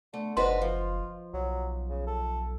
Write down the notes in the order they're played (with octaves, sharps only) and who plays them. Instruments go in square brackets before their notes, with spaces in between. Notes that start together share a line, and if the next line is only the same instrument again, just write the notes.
[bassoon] D3 [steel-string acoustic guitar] A3
[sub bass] F#1 [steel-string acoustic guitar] D#4 F#4 B4 [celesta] C5 D#5 C6
[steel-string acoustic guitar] F3 [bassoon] F4
[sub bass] B1 [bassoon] F#3
[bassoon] C#3
A4